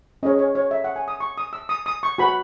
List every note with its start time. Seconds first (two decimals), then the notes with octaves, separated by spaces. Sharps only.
0.23 C#4 G#4 C#5 D#5
0.39 C#5
0.55 C#5
0.71 E5
0.84 F#5
0.96 G#5
1.08 D#6
1.20 C#6
1.38 D#6
1.53 E6
1.69 D#6
1.86 D#6
2.03 C#6
2.18 F#4 B4 B5